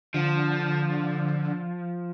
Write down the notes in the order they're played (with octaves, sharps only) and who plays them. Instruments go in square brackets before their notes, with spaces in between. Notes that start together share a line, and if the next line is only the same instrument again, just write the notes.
[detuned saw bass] D3 [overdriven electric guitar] F3